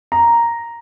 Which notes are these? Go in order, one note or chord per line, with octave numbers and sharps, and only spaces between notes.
A#5